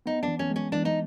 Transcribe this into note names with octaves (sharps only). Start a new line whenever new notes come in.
B3 D#4
E3 D4
C#4
G#3
C#4
E3 D4
D#4